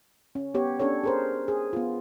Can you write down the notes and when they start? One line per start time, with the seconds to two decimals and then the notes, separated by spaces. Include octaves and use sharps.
0.35 C#4
0.54 B3 G4 C#5
0.80 C#4 D4 A4 C#5
1.04 G#4 A#4 C5
1.48 G#4
1.73 B3 F4